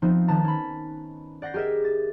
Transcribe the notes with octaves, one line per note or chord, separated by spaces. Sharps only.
F3 B3 C4 D#4
D#3 B4 A5 A#5 A6
C#4 B5
D5 F#5 G6 A#6 C7
G4 G#4 A#4 D#5 E5
A6